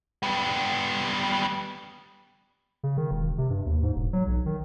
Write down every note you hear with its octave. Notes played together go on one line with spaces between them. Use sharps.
G3 B3
C#3
D#3
E1
C3
G2
D#2
G#2
E1
F#3
B1
D#3